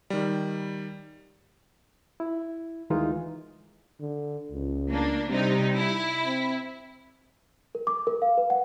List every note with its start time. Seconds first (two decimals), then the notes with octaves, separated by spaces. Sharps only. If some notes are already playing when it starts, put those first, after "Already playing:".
0.10 D#3 G3
2.20 E4
2.90 D2 D#3 E3 G#3 D#4 F4
4.00 D3
4.52 C#2
4.90 A#3 D4
5.30 C3 G3 D#4
5.76 E4
6.25 C4
7.75 A#4
7.87 D6
8.07 A#4
8.22 F5
8.38 B4
8.50 F#5